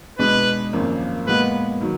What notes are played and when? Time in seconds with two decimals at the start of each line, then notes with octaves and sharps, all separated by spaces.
0.19 B2 G#3 D4 B4
0.73 G#1 F#2 F3 A#3
1.27 A#2 G#3 B3 B4
1.80 D#3 F#3